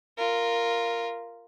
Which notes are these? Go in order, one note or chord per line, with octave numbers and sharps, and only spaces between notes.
F4 A#4